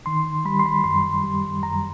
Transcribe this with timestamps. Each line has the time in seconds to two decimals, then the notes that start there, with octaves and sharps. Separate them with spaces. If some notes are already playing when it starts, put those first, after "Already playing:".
0.06 D#3 C6
0.45 G3 B5
0.59 C6
0.66 B5
0.84 F#2 C6
1.23 G3
1.63 F#2 A#5